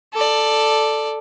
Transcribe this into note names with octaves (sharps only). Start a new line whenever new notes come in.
A4 D5